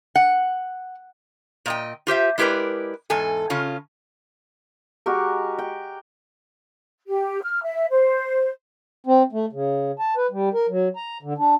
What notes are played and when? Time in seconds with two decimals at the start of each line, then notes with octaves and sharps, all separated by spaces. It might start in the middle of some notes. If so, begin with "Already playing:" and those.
0.16 F#5
1.66 A#2 D#5 G5
2.07 F4 G4 C5 E5
2.38 G#3 E4 G4 A#4 B4 D5
3.10 E2 G#2 A4 G#5
3.50 C#3 C#4 F4
5.06 G#3 F#4 G4 A#4
5.59 G5
7.08 G4
7.43 F6
7.63 E5
7.91 C5
9.06 C4
9.32 A3
9.52 C#3
9.99 A5
10.17 B4
10.31 G3
10.54 A#4
10.69 F#3
10.96 A#5
11.22 D3
11.38 D4